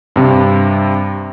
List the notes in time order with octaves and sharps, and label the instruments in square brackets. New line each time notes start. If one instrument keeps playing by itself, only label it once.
[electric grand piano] G2 C3